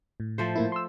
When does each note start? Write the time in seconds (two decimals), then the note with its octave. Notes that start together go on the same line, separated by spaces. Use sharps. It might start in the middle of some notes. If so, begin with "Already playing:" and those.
0.20 A2
0.38 F3 A3 C5
0.56 A2 A#3 E4
0.72 C6 E6